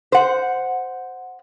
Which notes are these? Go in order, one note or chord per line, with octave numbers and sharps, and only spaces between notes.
C5 F#5